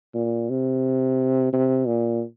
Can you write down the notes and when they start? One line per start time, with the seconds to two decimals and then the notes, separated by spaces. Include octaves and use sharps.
0.15 A#2
0.50 C3
1.53 C3
1.87 A#2